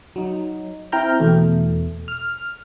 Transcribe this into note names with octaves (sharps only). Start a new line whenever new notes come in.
F#3 D#4
C4 E4 G5 A#5 F6 G6
E2 B2 A3
F6